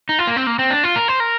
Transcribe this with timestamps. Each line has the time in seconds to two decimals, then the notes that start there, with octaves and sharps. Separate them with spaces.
0.09 D#4
0.19 F4
0.27 A#3
0.36 C4
0.47 A#3
0.59 C4
0.70 D4
0.84 F4
0.96 A#4
1.08 C5
1.20 A#4